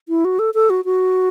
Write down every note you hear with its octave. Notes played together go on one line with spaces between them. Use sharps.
E4
F#4
A4
A4
F#4
F#4